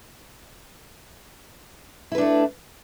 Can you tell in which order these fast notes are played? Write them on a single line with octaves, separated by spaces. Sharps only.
E4 B4 D4 A3